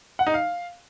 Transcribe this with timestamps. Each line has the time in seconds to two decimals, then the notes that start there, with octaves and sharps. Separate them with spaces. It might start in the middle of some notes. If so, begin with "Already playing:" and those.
0.19 F#5
0.27 D#4
0.34 F5